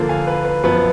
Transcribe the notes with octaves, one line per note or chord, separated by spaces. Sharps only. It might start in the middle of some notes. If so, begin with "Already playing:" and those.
Already playing: D3 F3 A#3
F5 G#5
B4
B4
F#2 F3 B3 B4